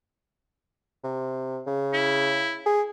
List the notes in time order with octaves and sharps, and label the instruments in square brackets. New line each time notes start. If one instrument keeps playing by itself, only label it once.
[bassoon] C3
C#3
[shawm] E4
[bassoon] G#4